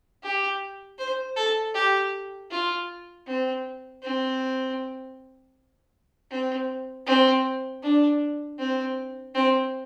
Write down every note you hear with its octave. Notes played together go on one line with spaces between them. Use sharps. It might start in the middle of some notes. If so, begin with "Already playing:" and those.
G4
C5
A4
G4
F4
C4
C4
C4
C4
D4
C4
C4